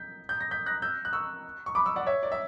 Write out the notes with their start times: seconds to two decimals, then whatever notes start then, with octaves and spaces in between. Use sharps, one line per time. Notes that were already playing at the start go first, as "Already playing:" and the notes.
Already playing: G6 B6
0.29 G6
0.41 A#6
0.51 G6 B6
0.66 F#6 A#6
0.82 E6 G6
1.05 F#6
1.13 C#6 E6
1.66 C#6
1.75 B5 D6
1.86 C#6 E6
1.96 D5 F#5
2.06 C#5 E5
2.23 D5
2.32 E5